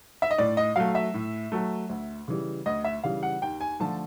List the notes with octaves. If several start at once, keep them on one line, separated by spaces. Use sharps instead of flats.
E5
D#5
A2 D5
D#5
F#3 A3 F5
E5
A2
F#3 A3
D2
C#3 E3 G3
D2 D#5
E5
C#3 E3 G3 F5
F#5
D#2 G5
G#5
D3 F3 A3 A5